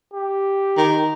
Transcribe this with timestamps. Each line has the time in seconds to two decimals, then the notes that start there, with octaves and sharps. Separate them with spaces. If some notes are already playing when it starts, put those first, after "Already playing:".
0.14 G4
0.77 D#3